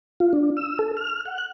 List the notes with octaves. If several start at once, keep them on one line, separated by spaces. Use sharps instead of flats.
F4
D4
E6
A4
F6
F#5
F#6